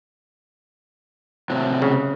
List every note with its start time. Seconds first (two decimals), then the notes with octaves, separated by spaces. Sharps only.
1.50 A2 C3 F#3
1.82 C#3